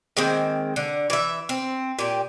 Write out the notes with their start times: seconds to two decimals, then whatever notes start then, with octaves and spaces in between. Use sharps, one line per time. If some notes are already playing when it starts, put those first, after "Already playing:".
0.17 D#3 G#3 A#3 C4
0.76 D3
1.10 E3 E5
1.49 C4
1.99 A#2 G4